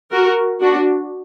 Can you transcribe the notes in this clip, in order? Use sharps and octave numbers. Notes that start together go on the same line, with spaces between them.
F#4 A#4
D4 F#4